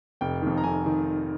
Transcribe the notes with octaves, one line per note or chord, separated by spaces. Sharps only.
F1 G5
F2 D#3
A#5
F1 G#5
D#3